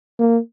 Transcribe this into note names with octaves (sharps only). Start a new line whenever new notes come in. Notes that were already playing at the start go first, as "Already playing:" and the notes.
A#3